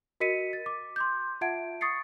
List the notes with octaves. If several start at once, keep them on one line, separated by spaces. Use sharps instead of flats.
F#4 A#4 D#5 B6 C#7 D#7
A6
D6
C6 D6 G6
F4 E5 F#5 A5 G#6 D7
C#6 D#6 A6 C7 C#7